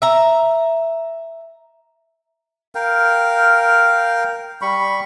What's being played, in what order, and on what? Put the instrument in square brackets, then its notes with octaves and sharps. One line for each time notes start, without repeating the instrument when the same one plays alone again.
[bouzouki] E5 A#5
[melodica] A#4 F5 G5
G3 B5 C#6